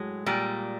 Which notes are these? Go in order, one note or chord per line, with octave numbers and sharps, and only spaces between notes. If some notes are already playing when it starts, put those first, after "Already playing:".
Already playing: A2 F#3 G#3
A#2 G3